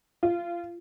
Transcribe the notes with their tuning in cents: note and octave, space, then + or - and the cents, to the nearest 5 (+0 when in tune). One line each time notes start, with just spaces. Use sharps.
F4 -20